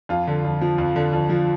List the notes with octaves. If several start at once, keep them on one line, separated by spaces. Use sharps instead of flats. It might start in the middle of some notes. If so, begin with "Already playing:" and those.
F2 F4
D3
F2
F3
F2
D3
F2
F3